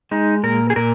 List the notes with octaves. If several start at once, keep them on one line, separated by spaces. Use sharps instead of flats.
G#3 D#4
A#2 A#4
G#4
A#2 A#4